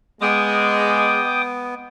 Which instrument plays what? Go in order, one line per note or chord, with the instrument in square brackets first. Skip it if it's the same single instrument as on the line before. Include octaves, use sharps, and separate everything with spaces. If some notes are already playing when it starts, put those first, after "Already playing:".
[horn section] G#3 [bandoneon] B3 [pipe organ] G5 D6 D#6